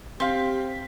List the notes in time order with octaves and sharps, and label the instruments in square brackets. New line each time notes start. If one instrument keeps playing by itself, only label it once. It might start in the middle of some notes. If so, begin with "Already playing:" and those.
[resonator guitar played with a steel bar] C4 [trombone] G4 [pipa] C5 F5 [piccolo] B6